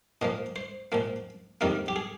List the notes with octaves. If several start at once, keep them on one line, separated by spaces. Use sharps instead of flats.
A#2 F3 A#3 D#5
C5
A#2 F3 A#3
F2 D#3 G3 A#3 A#4
G4
G#4